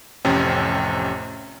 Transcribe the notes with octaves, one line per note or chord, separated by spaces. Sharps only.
A1 F2 C3 C#4 G5